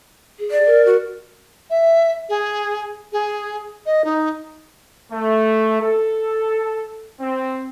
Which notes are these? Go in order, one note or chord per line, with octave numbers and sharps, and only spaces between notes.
G#4
D5
A#4
F#4
E5
G#4
G#4
D#5
D#4
A3
A4
C4